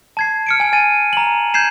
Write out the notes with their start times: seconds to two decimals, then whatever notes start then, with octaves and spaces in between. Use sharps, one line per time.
0.17 A5 G#6 C7
0.47 F6 C#7 D7
0.60 G#5 F6
0.73 G#5 A6 D#7
1.13 A#5 F#7
1.54 G6 G#6 C7 E7